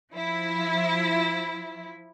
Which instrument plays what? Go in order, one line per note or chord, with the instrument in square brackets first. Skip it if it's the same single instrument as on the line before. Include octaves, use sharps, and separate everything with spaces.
[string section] F3 E4